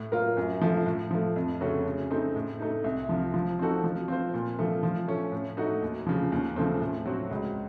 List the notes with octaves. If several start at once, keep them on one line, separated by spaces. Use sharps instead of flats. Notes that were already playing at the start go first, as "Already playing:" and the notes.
Already playing: A2
F#3 A#3 F4 A#4
F#2
F3 A3
A2
F3 A3
F2
C#3 A3 C#4 F#4
C#3
A3 C4 D#4
A2
A3 D#4
C2
C3 F3
F3
C4 D#4 F#4 A4
F3
C4 F4 C5
A#2
F3 A3
F3
A3 C#4
A2
A3 D#4 F#4
D#2
C#3 F3
D#2
C#3 F3 A3 C4
A2
F#3 C4 F#4
C#2